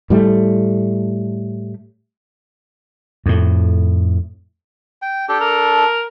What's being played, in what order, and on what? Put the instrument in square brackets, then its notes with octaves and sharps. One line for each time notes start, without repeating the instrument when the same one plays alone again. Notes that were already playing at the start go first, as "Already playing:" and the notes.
[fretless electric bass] A2 G3 A3
[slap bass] F2 A2
[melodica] G5
[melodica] D4 A4 [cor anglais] G4
[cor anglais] A#4